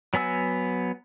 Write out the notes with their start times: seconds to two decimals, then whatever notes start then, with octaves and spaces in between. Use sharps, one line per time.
0.14 F#3 B3 G#5 E6